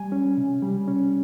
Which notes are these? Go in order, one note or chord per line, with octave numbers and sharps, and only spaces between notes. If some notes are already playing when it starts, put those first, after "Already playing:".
Already playing: G3 G#5
C#4
C3
G3
C#4